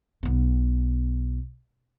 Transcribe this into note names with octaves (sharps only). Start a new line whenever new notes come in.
B1 B3